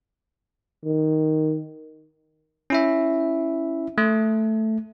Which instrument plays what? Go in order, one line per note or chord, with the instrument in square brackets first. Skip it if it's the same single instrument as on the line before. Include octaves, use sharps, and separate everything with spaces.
[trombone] D#3
[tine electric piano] C#4 E4 E5
A3